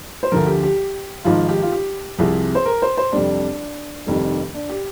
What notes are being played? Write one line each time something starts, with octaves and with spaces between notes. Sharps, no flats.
C5
D2 D3 F3 A#4
G4
G4
G#1 G#2 F3 F4
G4
F4
G4
C2 C3 F3 G#4
C5
A#4
C5
C5
F2 C3 G3 D4
F1 F2 C3 D#3 G3
D4
G4